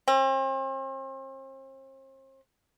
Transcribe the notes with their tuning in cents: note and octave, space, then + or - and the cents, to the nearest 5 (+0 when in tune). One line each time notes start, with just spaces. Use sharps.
C4 +40